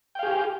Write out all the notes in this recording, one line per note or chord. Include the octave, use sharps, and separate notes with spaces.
G4 G#4 F5 G5